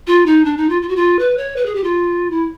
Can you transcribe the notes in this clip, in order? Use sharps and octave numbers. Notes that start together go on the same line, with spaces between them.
F4
D#4
D4
D#4
F4
F4
F#4
F4
B4
C#5
B4
G#4
G4
F4
E4